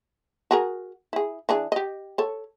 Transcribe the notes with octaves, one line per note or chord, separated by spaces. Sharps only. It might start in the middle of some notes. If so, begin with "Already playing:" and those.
F#4 G#4 A#4
E4 G#4
E3 D4 G#4
G4 D#5
A4 C#5